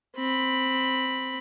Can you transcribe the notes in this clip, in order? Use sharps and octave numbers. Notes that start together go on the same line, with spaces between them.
C4 B5